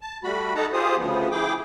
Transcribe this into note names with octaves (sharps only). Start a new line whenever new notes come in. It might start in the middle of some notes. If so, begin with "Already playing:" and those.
A5
G3 A3 F#4 B5
D#4 A4 F#5 A5 A#5
F4 G4 G#4 C5 D#6
D2 C#3 F3 B3
E4 G#4 G5 D6